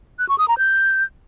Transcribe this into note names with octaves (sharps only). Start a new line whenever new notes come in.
F#6
C#6
D#6
A#5
G6